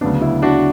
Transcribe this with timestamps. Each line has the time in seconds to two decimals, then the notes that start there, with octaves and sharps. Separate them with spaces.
0.01 D2 C#3 F#3 B3 D4
0.21 E4
0.42 D4 F#4